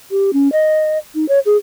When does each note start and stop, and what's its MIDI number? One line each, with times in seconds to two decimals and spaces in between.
0.11 0.31 67
0.33 0.51 61
0.52 0.98 75
1.15 1.25 63
1.29 1.39 73
1.46 1.57 68